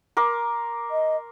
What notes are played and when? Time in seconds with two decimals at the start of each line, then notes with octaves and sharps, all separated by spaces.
0.17 A#4 C6 D6
0.91 D#5